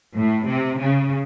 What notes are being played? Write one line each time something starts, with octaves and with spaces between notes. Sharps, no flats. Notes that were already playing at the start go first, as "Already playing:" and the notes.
A2
C3
C#3